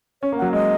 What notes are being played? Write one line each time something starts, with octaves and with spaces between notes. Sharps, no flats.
C#4 C#5
A#3
F#3 F#5
G#3 D#5